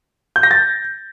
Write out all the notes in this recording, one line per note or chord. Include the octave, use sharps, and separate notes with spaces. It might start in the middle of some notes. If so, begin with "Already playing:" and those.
G6
A#6
A6